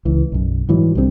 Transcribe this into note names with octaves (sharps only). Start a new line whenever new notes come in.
C#2 E3
B1 F#2
G#2 E3 F#3 G3
C2 D3 G3 C4